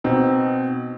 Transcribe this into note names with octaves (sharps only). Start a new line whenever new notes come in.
B2 C4 D#4